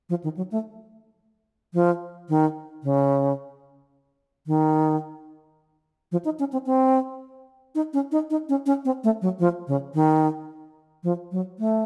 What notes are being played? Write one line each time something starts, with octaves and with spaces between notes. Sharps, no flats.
F3
D#3
F#3
A3
F3
D#3
C#3
D#3
F3
D#4
C#4
C4
C4
D#4
C#4
D#4
D#4
C#4
C#4
C4
A3
F#3
F3
C#3
D#3
F3
F#3
A3